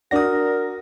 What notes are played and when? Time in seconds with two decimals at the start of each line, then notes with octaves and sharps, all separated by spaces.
0.11 D4 F#4 A#4 D5 D#6 A#6